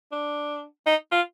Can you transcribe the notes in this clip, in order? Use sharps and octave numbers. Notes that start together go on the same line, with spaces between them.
D4
D#4
F4